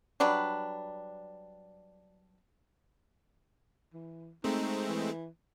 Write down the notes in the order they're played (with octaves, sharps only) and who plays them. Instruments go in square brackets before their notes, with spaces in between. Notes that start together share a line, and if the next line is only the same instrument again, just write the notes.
[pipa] F#3 G3 D4 B4
[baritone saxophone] E3
[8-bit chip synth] G#3 A3 C4 [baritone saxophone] D#4
[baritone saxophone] E3